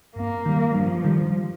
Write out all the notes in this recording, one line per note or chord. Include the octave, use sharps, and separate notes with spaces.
G2 A#3
D#3 G3
G2 F3
D#3 G3